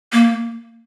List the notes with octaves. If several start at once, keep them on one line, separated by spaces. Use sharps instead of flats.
A#3